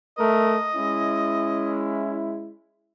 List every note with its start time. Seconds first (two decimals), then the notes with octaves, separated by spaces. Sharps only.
0.18 A3 A#4 D#5
0.75 G#3 C#4 E4